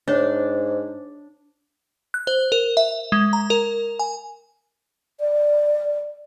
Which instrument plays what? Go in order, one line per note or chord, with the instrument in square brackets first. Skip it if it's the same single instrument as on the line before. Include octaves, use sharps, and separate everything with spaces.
[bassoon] G#2 [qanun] D4 [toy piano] C5 C#5
[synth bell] F#6
C5
A#4
E5
G#3
A#5
A#4
G#5
[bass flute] D5